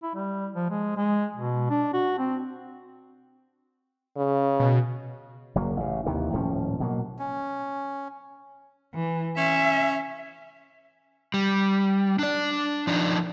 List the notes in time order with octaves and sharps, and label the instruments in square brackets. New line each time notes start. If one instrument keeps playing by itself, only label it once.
[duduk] E4
G3
F3
G#3
G#3
B2
D4
F#4
C4
[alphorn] C#3
[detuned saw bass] B2
[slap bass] F#1 F#3 A#3
A1 C#3
D#2 C3 D#3 E3
D#1 A2 F3 C#4
B2 F#3 A#3
[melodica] C#4
[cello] E3
[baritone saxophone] C#4 [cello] E5
[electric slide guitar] G3
D4 D5
F3 D4 D#4